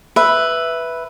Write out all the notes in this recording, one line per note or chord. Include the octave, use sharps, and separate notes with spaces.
B4 E5